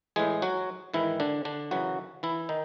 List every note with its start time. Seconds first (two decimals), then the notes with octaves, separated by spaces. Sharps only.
0.16 A2 E3 G#3 G#4
0.42 F#3 F#4
0.94 G#2 D#3 E3 E4
1.20 D3 D4
1.45 D3 D4
1.71 F#2 C#3 E3 F#3 F#4
2.23 E3 E4
2.49 D#3 D#4